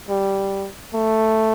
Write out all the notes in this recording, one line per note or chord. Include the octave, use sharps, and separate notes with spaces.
G3
A3